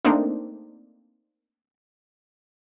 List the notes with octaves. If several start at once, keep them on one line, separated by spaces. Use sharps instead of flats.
A3 A#3 C4 D4 D#4